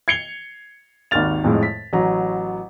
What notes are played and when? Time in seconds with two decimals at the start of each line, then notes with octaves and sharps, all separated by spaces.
0.08 G#6 C7 C#7 F7 G7
1.11 G#1 D#2 D#3 F6 A6 F7
1.44 F2 A2 G#3
1.63 B6
1.93 A1 F#3 A#5